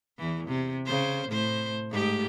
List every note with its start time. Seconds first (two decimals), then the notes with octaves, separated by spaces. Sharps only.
0.18 E2 E3
0.48 C3
0.86 C#3 C5
1.29 A2 C5
1.91 G#2 A3 G4